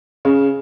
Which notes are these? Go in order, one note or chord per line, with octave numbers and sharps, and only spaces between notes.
C#3